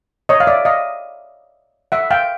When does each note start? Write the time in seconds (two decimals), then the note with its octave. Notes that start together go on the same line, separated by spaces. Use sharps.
0.29 C#5 D#5
0.40 F5
0.47 D5 E5
0.65 D#5 F5
1.92 E5 F#5
2.11 F5 G5